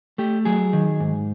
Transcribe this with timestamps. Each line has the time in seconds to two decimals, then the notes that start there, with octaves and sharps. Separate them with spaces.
0.18 A3 G4
0.45 F#3 G#4
0.73 D#3
1.00 G#2